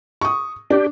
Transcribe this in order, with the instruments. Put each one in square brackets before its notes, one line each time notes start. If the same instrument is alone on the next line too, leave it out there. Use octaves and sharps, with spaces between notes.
[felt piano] C#6 D#6
[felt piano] D4 [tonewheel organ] G4